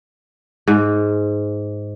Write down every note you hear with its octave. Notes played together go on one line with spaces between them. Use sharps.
G#2